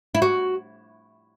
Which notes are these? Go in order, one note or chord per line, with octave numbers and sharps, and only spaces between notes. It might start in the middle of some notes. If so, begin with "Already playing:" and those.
E4
F#4